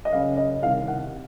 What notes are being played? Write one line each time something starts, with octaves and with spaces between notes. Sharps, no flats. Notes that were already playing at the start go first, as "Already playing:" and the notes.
D#5
F#2 C#3 F5
D#5
C2 C3 D#3 F5
F#5